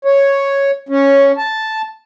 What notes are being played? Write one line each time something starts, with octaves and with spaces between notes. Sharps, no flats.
C#5
C#4
A5